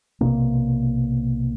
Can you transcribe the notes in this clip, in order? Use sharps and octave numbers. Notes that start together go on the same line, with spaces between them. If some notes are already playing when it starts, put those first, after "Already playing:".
B1 C3 A#3